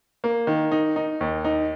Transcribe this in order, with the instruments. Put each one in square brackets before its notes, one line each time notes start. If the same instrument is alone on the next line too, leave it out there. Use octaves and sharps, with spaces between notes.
[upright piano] A#3
D#3
D#4
D#4
D#2
D#4